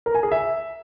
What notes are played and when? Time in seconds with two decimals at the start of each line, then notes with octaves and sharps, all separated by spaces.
0.06 A#4
0.15 G#5
0.23 G#4
0.32 E5